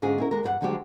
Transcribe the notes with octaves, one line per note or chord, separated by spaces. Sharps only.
G#2 D3 C#4 F4 G#4
C#4 E4 A#4
D#2 G#3 A#4
E2 G2 A4 F#5
D2 D3 F3 F#3 G#3 G4